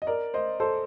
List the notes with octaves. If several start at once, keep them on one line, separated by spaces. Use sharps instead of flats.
D#5
A#4 D5
C5 D#5
A4 C5